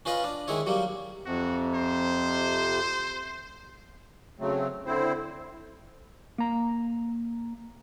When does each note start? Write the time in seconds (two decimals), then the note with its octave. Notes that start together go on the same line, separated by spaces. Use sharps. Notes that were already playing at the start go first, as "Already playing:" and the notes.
0.05 C#4 F4 B4 D#5 B5
0.24 D4
0.48 D#3 G#3 E4 C#5
0.66 F#3 G3 A#3
1.26 F2 C3 F#4
1.75 C5
4.39 C#3 F#3 A3 C4
4.86 D3 C4 E4 C5
6.38 A#3 A#5